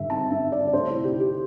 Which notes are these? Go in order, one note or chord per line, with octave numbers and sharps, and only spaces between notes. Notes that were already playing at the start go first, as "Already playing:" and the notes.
Already playing: G2 D3 E5
C4 A5
G2 E5
D3 D5
D5
D2 C5
E4
C3
G4
C4 G4